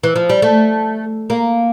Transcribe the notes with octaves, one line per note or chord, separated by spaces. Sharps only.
E3
F3
G3
A3
A#3